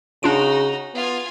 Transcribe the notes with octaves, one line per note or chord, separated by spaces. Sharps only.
C#3 D4 D#4 F4 F#4 D7
B3 F4 G#5